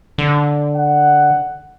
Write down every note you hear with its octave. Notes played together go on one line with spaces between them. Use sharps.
D3
F#5